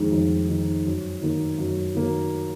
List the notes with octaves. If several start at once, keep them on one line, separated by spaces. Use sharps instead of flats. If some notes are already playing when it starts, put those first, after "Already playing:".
Already playing: F2 D#3 G#3 D#4
F2
D#3 G#3 D#4
F#2
D#3 A#3
F#2
D#3 A#3